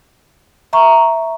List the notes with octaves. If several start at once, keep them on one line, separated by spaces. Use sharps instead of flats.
E5 A#5 C#6